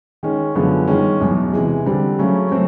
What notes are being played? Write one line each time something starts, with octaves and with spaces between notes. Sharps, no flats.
D#3 G#3 C#4
F#2 D3 F3 G#3 B3
G2 D#3 G#3 C#4
E2 B2 F#3
C3 E3 G#3
D3 G3 C4
C#3 F#3 A3 C#4
F#3 A3 C4